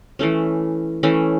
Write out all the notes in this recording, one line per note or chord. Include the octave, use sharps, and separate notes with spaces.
E3 A3 C#4
E3 A3 C#4